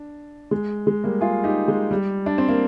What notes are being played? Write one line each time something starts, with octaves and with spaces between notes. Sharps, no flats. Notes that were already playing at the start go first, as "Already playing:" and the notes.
Already playing: D4
G#3
G#3
G3 A#3
F4 G#4
D#4 G4
G#3
G3
D4
C4
A#3